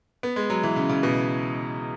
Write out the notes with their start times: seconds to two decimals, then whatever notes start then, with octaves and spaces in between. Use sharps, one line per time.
0.23 B3
0.36 G#3
0.50 F#3
0.63 E3
0.76 C#3
0.89 C#3
1.03 B2